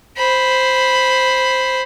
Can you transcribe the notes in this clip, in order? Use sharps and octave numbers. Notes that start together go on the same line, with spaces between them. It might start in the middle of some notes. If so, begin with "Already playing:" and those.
C5 B5